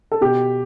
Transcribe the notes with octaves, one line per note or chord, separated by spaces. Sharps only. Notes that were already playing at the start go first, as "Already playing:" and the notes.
A4
B2 G4